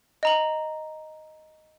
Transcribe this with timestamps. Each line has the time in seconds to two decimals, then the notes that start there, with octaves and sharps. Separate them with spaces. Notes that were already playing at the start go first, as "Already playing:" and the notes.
0.23 D#5 A#5 F#7